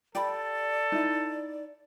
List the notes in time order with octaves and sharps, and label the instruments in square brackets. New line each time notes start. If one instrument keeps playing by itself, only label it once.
[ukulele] G4 B5 [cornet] A4 [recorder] D5
[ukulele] D#4 E4